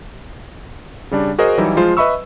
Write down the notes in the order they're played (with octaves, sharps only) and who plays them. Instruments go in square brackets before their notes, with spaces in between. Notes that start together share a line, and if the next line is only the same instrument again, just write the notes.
[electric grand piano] C#3 G3 D4
F#4 G#4 A#4 C5 D#5
E3 F#3 G3 D#4 E4
F3 G#3 F4 C5
B4 D#5 E5 B5 C#6 E6